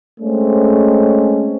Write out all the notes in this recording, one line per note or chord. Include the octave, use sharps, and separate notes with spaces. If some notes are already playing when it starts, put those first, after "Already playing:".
G#3 A3 C4 C#4